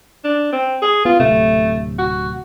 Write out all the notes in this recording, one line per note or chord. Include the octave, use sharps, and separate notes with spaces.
D4
C4
G#4
B3 F4
D1 C3 A3
F#4